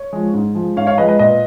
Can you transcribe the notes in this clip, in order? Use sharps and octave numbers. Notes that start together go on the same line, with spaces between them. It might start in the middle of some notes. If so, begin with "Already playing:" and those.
Already playing: C#5
F3 G#3
G#2
F3 G#3
G#2 C#5 F5
C#5 F5
F3 G#3 B4 D#5
B4 D#5
A#2 B4 D#5